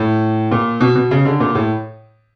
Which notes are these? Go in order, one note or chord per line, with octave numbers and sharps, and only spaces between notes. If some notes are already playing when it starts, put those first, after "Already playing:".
Already playing: A2
A#2
B2
B2
C#3
D3
A#2
A2